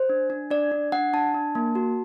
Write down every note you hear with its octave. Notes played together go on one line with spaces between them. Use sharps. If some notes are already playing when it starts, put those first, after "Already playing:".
Already playing: C5
D4
D4
D4 D5
D4
D4 F#5
D4 A5
D4
A#3
F#4